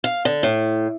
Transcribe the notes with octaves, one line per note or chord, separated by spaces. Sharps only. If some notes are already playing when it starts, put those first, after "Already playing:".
F5
D3
A2